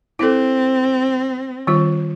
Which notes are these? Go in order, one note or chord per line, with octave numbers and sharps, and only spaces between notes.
C4 E4 A4
D#3 G3 F4